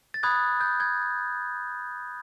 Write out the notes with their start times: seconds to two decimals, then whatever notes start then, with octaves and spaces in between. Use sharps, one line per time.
0.14 A6
0.23 B5 D#6 F#6 G#6
0.61 G6
0.80 G#6